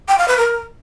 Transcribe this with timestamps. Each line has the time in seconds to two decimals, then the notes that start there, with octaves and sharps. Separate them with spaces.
0.08 G5
0.18 F5
0.28 B4
0.38 A#4